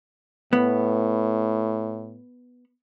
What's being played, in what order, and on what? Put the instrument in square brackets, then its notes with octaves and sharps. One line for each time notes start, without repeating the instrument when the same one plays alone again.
[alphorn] A2 [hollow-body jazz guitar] B3